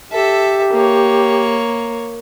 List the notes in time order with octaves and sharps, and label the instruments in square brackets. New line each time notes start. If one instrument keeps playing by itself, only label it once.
[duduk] G4 [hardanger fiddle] A4 E5
[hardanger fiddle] A#3 C#5